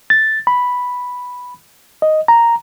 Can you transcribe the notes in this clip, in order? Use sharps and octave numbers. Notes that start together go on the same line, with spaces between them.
A6
B5
D#5
A#5